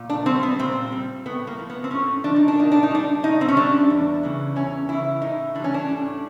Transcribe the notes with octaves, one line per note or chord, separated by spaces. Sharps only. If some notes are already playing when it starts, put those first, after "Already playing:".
Already playing: A#2
D4
G3 C4
B3
A#2 C4
G3
A2 B3
A#3
F3
B3
C4
A2 C#4
F3 D4
D#4
D4
A#2 D#4
D4
D#4
G3 D4
A#2 D#4
C4
C#4
G3 D4
E2
C#3 E3
E2 C#4
C#3 E3 E4
A2 D#4
E3 D4
G3 C#4
D4
A2